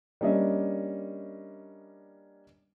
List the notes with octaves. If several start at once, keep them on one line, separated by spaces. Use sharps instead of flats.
G3 A#3 C#4 D4 D#5 E5